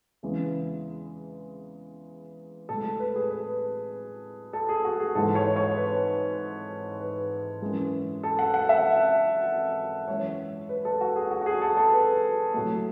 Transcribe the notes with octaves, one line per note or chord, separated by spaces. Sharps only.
E2 C#3 E3 G#3
A2 G#3 A4
A4
B4
G#4
B4
A4
G#4
F#4
G#4
G#2 E3 G#3 A4
C#5
C#5
B4
B4
F#2 E3 G#3
A4
F#5
F#5
E5
F#2 E3 G#3 C#5
B4
A4
F#4
G#4
F#4
F#4
G#4
A4
A4
B4
A2 F#3 A3